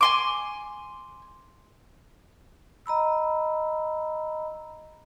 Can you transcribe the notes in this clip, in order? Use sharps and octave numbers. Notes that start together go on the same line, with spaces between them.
G#5 C6 D6
D#5 A#5 B5 E6